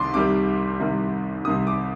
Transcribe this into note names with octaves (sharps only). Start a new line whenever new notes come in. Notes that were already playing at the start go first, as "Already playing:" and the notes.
Already playing: C2 C3 D#3 C6 D6
C2 C3 D#3 G3 D6
C2 C3 D#3 G3
C2 C3 D#3 G3 D#6
D6